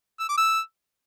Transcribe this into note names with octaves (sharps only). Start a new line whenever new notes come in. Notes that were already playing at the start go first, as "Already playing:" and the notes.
E6
D6
E6